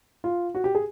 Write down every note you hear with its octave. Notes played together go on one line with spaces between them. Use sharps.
F4
F#4
G4
G#4